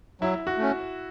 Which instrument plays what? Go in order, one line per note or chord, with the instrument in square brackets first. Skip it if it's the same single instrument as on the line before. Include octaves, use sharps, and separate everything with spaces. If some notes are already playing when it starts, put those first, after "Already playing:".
[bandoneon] F#3 [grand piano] E4
[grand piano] F#4
[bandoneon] A3 C#4